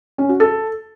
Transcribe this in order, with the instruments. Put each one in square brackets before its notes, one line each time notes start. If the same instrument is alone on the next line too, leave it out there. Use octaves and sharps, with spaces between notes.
[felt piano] C#4
F#4
A4